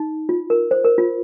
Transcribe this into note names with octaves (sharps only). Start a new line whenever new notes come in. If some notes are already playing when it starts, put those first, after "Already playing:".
Already playing: D#4
F4
A#4
C5
A#4
F4